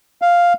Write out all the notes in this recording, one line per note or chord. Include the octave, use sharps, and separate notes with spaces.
F5